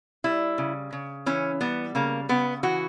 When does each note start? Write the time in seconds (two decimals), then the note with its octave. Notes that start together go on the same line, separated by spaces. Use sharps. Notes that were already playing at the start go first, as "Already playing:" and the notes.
0.24 G3 E4
0.58 C#3
0.93 C#3
1.26 E3 C#4
1.61 G3 B3
1.95 C#3 A#3
2.29 C#3 B3
2.63 E3 F#4